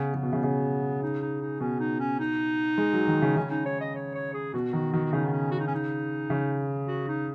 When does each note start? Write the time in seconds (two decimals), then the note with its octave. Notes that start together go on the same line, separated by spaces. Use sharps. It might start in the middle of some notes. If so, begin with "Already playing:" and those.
Already playing: C#3 B3
0.14 C#3
0.23 B2
0.33 C#3
0.43 C#3
1.03 D#4
1.22 D#4
1.42 D#4
1.60 B2 C#4
1.80 D#4
2.00 C#4
2.20 D#4
2.78 G#3
2.93 F#3
3.08 D#3
3.22 C#3
3.37 C#3 C#4
3.51 D#4
3.66 C#5
3.81 D#5
3.96 C#5
4.15 C#5
4.34 G#4
4.54 B2 F#4
4.73 D#3 F#4
4.93 D#3 F#4
5.05 F#4
5.13 C#3 D#4
5.25 B3
5.32 C#4
5.52 F#4
5.59 D#4
5.68 C#4
5.75 D#4
6.30 C#3
6.88 F#4
7.08 D#4